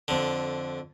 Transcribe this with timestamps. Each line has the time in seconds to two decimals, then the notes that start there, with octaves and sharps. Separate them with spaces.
0.08 F2 D3